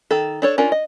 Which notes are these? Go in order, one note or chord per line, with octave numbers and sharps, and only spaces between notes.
D#3 A4
D4 A4 C#5
C#4 D4 F4 A#4
D#5